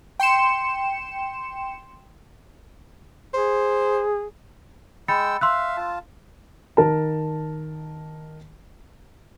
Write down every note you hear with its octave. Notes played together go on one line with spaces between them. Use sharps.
G5 C6 C#7 E7
G#4 C5
G#3 G5 B5 E6 A6 C#7
E5 F5 C6 E6 F#6
F4 A5
D#3 A#4 A5